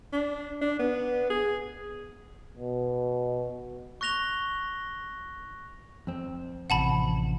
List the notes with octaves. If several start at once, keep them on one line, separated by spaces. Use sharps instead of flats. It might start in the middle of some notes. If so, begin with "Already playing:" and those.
D4
D4
B3
G#4
B2
C#6 F#6 A#6 F7 G7
F2 C4
A1 C3 F#5 A5 B5